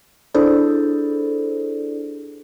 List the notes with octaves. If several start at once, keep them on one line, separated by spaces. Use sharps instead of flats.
D4 E4 G#4 A4 C5 D5